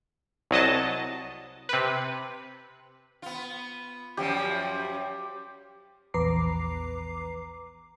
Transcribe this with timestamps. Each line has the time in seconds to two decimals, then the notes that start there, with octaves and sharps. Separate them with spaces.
0.51 C2 F#3 D#5 A5
1.69 C3 B4
3.22 B3 F4
4.17 F#2 F3 G3 G4
6.14 A#1 E2 B4 A#5 D6 C7